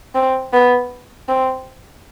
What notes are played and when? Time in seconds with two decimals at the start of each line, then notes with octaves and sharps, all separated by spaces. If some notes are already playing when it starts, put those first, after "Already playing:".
0.15 C4
0.53 B3
1.29 C4